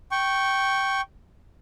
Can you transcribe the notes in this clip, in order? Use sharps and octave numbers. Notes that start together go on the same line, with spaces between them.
G5 C#6